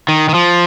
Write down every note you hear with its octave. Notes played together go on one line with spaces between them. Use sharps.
D#3
D#3
F3